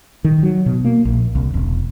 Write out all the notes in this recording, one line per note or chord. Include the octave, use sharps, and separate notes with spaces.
D#3
F#3
B2
A#3
A#1
C2
E1